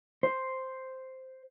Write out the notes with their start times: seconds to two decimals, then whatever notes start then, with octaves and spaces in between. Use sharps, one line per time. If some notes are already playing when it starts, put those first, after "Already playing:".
0.23 C5